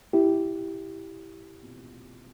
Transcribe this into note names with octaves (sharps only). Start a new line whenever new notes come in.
E4 G4